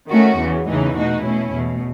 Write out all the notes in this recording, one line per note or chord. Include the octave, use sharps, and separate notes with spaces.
D#3 A3 C#4 F#4
E2 C#3 E3
E2 C#3 E3 A3 D#4
B2 A3 D#4 F#4
B2 A3 C#4 E4
E2 B2 A3